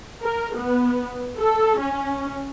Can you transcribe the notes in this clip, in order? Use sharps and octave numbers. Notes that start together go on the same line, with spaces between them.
A#4
B3
A4
C#4